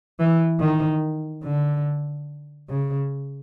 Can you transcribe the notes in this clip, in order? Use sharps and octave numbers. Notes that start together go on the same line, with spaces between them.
E3
D#3
D3
C#3